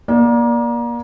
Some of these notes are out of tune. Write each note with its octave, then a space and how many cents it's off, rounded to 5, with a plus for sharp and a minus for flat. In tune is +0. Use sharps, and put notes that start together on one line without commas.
A#3 +30 D5 +0